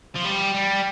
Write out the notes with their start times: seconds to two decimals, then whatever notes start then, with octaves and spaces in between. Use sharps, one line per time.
0.16 F3
0.25 G3
0.55 G3